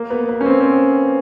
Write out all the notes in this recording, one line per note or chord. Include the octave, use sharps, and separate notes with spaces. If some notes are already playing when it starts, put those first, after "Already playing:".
Already playing: A#3
B3
B3
C#4
C4
C4